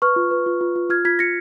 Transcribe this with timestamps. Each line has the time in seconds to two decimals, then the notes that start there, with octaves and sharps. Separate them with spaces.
0.02 B4 C#6 F6
0.16 F4
0.31 B4
0.46 F4
0.61 F4
0.76 F4
0.90 F4 F6 G#6
1.05 F4 G#6 B6
1.19 F4 A#6 C#7